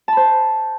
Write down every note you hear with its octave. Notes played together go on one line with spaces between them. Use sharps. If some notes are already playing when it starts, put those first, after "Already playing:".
C5 A5 B5